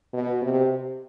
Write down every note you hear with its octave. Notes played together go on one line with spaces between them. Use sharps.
B2
C3